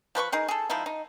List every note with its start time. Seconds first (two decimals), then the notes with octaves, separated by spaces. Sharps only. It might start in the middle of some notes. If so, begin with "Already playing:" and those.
0.15 F3 B4 C6 C#6
0.32 D#4 G#4 A#4
0.48 G#4 A4
0.70 F3 G#3 D#4 E4
0.86 D#4